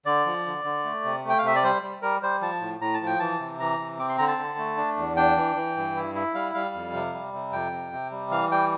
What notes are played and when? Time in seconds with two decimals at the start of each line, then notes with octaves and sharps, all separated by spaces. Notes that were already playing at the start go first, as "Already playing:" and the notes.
0.06 D3 D5
0.26 F3
0.46 D3
0.64 D3
0.85 A3
1.04 C3
1.24 A3 G5
1.38 F5
1.43 C3 E5
1.55 D5
1.64 G3 C5
1.82 G3
2.02 G3 A#4
2.22 G3 C5
2.41 F3 A5
2.61 A2
2.81 A2 A#5
2.94 A5
3.01 F3 G5
3.20 E3 A5
3.40 C3
3.60 E3 A#5
3.79 C3
3.98 C4 D6
4.09 C6
4.18 D3 A#5
4.28 A5
4.38 D3
4.58 A3
4.77 D4
4.97 E2
5.17 D4 G5
5.36 E3
5.56 E3
5.76 G2
5.96 E4
6.15 E4
6.35 G3 F5
6.54 G3 F5
6.75 F2
6.93 C3
7.13 G3
7.34 C3
7.52 F2 G5
7.72 C3
7.93 C3
8.11 G3
8.31 E3 F5
8.52 G3 G5